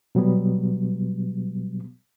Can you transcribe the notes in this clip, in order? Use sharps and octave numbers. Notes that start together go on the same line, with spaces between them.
B2 F#3 G3 B3